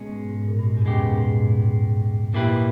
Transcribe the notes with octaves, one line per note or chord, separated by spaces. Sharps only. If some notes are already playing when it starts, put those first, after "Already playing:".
Already playing: B2 G#3 C#4
G#2
G#2
G#2
A#2
G2
G#2
E2
G2 C#3 G#3 B3 G4
A#2
G#2
A#2
G#2
G#2
A#2 A#3 E4 G4 B4